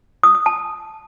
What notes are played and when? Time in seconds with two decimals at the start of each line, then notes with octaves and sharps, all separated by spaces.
0.23 D#6
0.35 D#6
0.46 A5